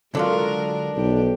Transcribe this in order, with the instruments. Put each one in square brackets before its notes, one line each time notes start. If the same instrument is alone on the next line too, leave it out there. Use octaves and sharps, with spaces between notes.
[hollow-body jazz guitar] D3 F#3 F4 [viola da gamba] G#3 A#4 [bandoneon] D4
[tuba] B1 [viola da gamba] F3 G4